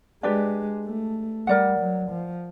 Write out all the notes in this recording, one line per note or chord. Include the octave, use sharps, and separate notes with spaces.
G#3 D4 G4 B4 D5
A3
G3 A#4 D5 F#5
F#3
F3